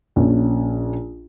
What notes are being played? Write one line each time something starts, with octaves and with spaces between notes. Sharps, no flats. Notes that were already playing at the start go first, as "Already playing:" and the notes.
A#1 C#4